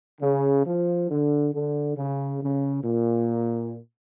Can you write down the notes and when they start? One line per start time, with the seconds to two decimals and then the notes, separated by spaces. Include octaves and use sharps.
0.21 C#3
0.65 F3
1.09 D3
1.52 D3
1.96 C#3
2.41 C#3
2.84 A#2